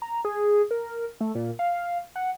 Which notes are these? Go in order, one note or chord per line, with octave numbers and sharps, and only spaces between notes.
A#5
G#4
A#4
A3
A#2
F5
F#5